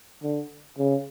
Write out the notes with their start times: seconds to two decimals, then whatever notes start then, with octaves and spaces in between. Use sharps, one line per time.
0.23 D3
0.79 C#3